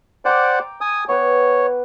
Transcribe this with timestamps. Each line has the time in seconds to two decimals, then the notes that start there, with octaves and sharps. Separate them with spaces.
0.25 C5 D5 F#5 G5 A#5 D6
0.81 G#5 D#6
1.09 B3 B4 C#5